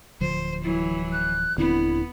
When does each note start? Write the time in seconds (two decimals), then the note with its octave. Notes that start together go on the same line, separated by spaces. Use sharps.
0.21 D1 D3 F3 C5
0.64 E3 F#3 E4
1.12 F#6
1.58 D#1 D3 B3 C4 E4